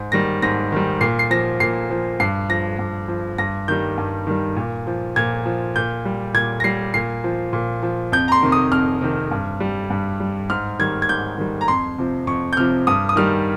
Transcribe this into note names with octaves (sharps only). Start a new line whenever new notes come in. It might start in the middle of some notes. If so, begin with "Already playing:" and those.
Already playing: G#2
D#3 G3 A#6
G#2 A#6
D#3 G3
A#2 C7
C7
F3 A#6
A#2 C7
F3
G2 C7
F3 A#6
G2
F3
G2 A#6
D#3 G3 G6
G2
D#3 G3
A#2
F3
A#2 G#6
F3
A#2 G6
G3
A#2 G#6
A#6
G3 C7
A#2 C7
F3
A#2
F3
F2 G6
A#5
C6
C3 D#3
D#6
F2 F6
C3 D#3
G2
G3
G2
G3
G#2 F6
D#3 G3 G#6
G#6
G#2 G6
D#3 G3
A#5
F2 C6
C3 F3
F2 C#6
G6
C3 F3 F6
G2 D#6
D#6
D#3 G3 F6